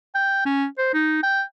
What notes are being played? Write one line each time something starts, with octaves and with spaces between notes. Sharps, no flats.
G5
C#4
C5
D#4
G5